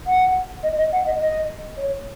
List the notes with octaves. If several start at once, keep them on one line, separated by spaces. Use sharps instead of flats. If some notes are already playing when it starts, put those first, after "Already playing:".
F#5
D#5
D#5
F#5
D#5
D#5
C#5